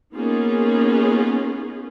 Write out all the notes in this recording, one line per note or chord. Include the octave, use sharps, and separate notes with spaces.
A#3 B3 C#4 D#4 F4 G#4